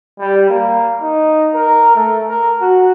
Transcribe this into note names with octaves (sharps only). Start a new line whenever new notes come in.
G3
A#3
D#4
A#4
A3
A#4
F#4